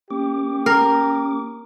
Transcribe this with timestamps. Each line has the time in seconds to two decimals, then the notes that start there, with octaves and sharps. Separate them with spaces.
0.11 A#3 C#4 G4 D6
0.66 A#4